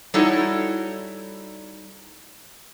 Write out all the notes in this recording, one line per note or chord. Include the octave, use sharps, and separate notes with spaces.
G3 D#4 E4 F#4 A4 C#5